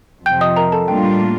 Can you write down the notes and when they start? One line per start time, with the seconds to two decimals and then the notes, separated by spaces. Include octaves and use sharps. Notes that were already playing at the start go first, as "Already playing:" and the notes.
0.25 F2 C3 F3 G5 G6
0.41 D#5 D#6
0.57 A#4 A#5
0.72 A4 A5
0.88 A2 G3 A#3 D4 F4 G5